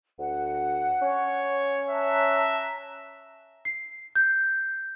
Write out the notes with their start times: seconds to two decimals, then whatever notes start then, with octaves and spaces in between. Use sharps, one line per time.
0.19 D2 F#5
1.02 C#4 C#5
1.90 E5 A5 A#5 F#6
3.65 C7
4.15 G6